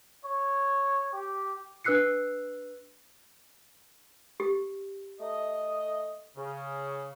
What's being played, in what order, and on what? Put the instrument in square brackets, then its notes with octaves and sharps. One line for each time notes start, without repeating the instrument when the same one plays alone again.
[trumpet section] C#5
G4
[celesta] D4 B4 E6 F#6 C7 C#7
[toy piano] G4
[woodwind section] A3 D#5
C#3